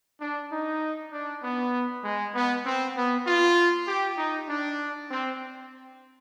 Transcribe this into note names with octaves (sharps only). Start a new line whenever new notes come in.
D4
D#4
D4
B3
G#3
B3
C4
B3
F4
G4
D#4
D4
C4